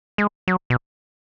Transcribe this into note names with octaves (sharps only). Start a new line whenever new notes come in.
G#3
F#3
B2